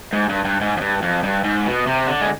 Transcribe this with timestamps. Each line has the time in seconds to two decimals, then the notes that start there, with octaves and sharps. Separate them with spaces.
0.13 G#2
0.29 G2
0.45 G2
0.61 G#2
0.77 F2
0.81 G2
1.02 F2
1.23 G2
1.44 G#2
1.66 B2
1.87 C3
2.07 D3
2.21 G#3